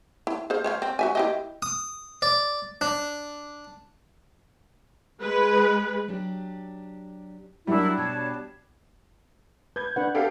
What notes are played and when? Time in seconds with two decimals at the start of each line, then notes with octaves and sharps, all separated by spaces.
0.27 E4
0.50 G#4 C5 F5
0.64 C5 C#5 F5
0.82 C4
0.99 F#4 E5 G#5
1.15 E4 G4 D#5
1.62 D#6
2.22 D5
2.81 D4
5.20 G#3 B4
6.08 F#3 D4 G4
7.67 F#3 G3 D4 E4 F#4 A#4
7.97 B2 C#5 A5
9.76 B4 G6 G#6
9.96 D4 B4 F#5
10.15 G4 A4 F5